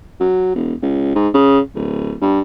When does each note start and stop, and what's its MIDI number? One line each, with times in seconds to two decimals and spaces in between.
0.20 0.50 54
0.55 0.74 28
0.82 1.12 37
1.15 1.29 44
1.34 1.60 49
1.75 2.14 26
2.21 2.41 43